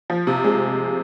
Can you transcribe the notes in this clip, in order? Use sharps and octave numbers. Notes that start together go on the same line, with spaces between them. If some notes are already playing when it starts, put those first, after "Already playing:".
F3
C3
G#3